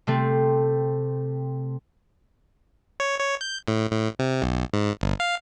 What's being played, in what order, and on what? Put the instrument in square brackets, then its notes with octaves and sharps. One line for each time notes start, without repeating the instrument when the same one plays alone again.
[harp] C3 A3 C4
[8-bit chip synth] C#5
C#5
G6
A2
A2
C3
B1
G#2
G1
F5